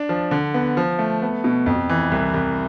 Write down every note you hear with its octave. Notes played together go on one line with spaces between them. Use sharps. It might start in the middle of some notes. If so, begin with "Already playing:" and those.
Already playing: D4
F3
D3
B3
F3
A3
B3
B2
F2
E3
C2
C2